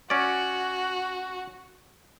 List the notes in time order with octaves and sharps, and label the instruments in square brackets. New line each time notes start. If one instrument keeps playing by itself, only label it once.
[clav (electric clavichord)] C#4 D5 [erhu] F#4